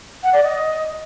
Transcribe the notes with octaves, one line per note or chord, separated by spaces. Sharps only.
F#5
D5
D#5